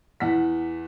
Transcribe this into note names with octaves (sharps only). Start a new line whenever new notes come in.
E2 F#5 B6